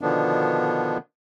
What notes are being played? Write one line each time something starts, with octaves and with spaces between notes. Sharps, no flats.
B2 D3 D#3 F3 B3 D4